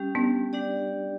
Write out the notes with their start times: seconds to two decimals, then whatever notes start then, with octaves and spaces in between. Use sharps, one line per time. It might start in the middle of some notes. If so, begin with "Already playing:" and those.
Already playing: G3 C#4 G4
0.15 B3 D4
0.53 G3 D4 G4 D5